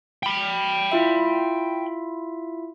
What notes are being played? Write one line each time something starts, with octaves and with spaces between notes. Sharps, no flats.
G5 B5
E4 F4 E5